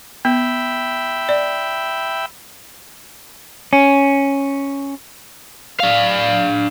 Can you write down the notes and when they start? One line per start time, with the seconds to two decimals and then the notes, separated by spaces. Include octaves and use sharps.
0.25 B3 E5 G5 B5
1.29 D5
3.73 C#4
5.80 D4 F5